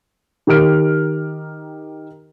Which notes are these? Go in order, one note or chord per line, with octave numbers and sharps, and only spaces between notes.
D#3 G4 A#4 F6 D7